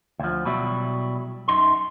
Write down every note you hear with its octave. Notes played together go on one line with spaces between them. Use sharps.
D2 F3
B2 F#3 G3 E4
F#2 D#4 C6